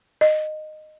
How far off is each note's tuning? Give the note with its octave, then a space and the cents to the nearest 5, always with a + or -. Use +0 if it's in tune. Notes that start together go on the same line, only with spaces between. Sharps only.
D#5 -15